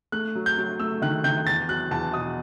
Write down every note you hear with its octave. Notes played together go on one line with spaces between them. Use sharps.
A3 F#6
F#3
G6
F#3
A3 E6
D#3 F#6
D#3 G6
E2 A6
F#3 F#6
E2 A5
B2 D#6